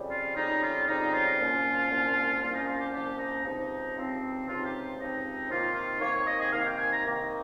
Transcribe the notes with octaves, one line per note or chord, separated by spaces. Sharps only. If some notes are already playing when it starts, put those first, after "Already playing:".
Already playing: F2 C#3 G3
F4
F2 C#3 G3 D#4
F4
F2 C#3 G3 D#4
F4
C2 A#2 F3 A#3 C#4
C2 A#2 F3 A#3 C#4
C2 A#2 F3 A#3 C#4 F4
D#4
F4
G4
C2 A#2 F3 A#3 C#4 G4
D#4
C#2 C3 F3 C4 D#4
C#2 C3 F3 C4 D#4
C#2 C3 F3 C4 D#4 F4
G4
C#2 C3 F3 C4 D#4
C3 D#3 A#3 D#4 F4
F4
C3 D#3 A#3 D#4 C#5
C#5
D#5
G#4
C3 D#3 A#3 D#4 F5
G5
G#5
A#5
C3 D#3 A#3 D#4